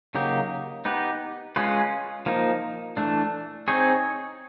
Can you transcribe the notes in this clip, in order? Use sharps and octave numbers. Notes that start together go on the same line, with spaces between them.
C#3 F#3 A#3 D#4 G4
B3 D#4 G4 B4
G#3 C#4 F4 G#4 B4
F3 A#3 D#4
E3 A3 D4
C4 D#4 G#4 C#5